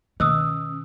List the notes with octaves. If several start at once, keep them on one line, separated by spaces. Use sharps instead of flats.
B2 D#3 C#4 D#6 E6 F#6